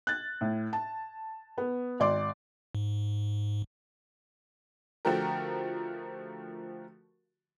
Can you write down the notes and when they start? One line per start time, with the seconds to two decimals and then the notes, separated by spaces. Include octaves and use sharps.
0.07 F#6 A6
0.41 A2
0.73 A5
1.58 B3
2.00 G#1 D5 C6 D6
2.75 G#2
5.05 D3 F3 A3 F#4 G4 A#4